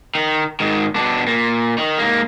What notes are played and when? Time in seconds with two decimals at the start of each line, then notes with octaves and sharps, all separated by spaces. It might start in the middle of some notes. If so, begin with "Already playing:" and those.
0.15 D#3
0.60 G#2 D#3
0.96 B2 D4
1.27 A#2
1.78 D#3
1.98 G#2 A#3